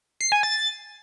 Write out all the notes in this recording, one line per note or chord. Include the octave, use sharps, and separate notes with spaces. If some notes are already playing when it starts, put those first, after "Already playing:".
C7
G#5
A6